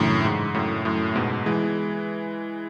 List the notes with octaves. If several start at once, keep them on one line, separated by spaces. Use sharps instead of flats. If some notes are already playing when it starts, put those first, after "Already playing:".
Already playing: F#2 A2 C#3 E3 A3 D4
G#2
F#2 A2
F#2 A2
G#2 B2
E3 G#3